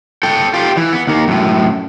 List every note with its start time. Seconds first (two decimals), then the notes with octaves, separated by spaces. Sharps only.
0.23 A4 G5
0.54 F4 G4
0.77 E3
0.93 B3
1.07 D#2 A#3
1.28 F#2 A2